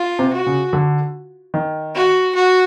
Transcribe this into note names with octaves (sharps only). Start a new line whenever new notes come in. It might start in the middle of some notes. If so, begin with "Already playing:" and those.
Already playing: F4
C3
F#4
C#3
D3
D#3
F#4
F#4